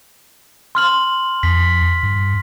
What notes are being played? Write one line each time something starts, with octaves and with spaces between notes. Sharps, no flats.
C6 F6 F#7
F2 B6
G2